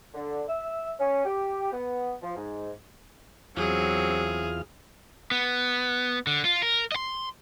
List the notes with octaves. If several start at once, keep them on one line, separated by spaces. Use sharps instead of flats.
D3
E5
C#4
G4
B3
F3
G#2
E2 F#3 C4 F4 G#4 F6
B3
D3
F4
A#4
D#5 C6